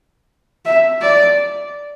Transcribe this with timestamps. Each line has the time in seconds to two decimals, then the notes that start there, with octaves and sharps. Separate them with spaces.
0.65 E5
1.01 D5